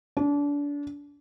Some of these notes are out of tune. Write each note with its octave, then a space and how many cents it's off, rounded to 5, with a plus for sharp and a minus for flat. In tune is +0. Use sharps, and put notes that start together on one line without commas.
D4 -30